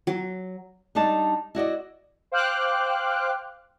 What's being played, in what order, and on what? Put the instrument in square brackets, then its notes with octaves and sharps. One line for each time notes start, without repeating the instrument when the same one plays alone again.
[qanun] F#3
[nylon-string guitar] G3 D4 D#4 A5
E4 F#4 D5 D#5
[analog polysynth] C5 F5 G5 D6 F6 F#6